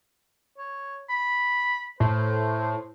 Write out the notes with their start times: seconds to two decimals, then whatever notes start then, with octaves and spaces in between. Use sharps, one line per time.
0.58 C#5
1.10 B5
2.00 A2 C5